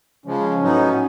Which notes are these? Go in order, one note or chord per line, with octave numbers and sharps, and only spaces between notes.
C#3 F3 G#3 C#4
A2 F#3 B3 D#4